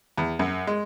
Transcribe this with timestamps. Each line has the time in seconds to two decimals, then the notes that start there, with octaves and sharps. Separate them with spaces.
0.18 E2
0.39 F#2
0.67 G#3